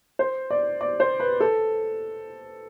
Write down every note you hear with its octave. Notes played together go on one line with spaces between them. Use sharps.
C5
D5
D5
C5
B4
A4